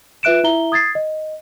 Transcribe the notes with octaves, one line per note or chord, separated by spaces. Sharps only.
F4 B4 E5 F#6 D7 E7
E4 E5 A#5 G7
D#6 G#6 A6 C7
D#5